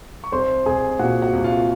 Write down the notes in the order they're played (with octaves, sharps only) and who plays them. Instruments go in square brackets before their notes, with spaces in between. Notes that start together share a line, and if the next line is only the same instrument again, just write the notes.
[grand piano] C#6
C2 C5 C6
C2 G#4 G#5
A#2 F#4 F#5
F#4 F#5
C2
F4 F5